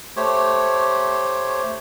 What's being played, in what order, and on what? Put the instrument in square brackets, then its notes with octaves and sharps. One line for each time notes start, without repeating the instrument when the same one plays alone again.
[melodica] A3 G4 C5 C#5